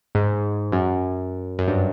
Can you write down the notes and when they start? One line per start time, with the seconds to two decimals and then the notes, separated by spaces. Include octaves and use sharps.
0.15 G#2
0.72 F#2
1.59 F#2
1.68 G2